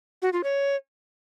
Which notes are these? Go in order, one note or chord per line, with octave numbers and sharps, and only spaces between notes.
F#4
F4
C#5